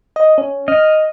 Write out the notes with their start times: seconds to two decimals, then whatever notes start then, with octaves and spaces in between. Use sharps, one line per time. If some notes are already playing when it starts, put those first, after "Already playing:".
0.16 D#5
0.38 C#4
0.68 D#5 F6